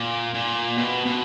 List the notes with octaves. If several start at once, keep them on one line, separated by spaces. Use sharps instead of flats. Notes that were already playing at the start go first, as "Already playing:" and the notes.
Already playing: A#2
A#2
B2
B2